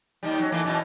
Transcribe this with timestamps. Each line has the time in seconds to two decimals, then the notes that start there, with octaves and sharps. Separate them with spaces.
0.23 D#2 D#3 G3
0.39 F#3 C#4
0.52 E3 A3 A#3
0.64 F#2 B2 E3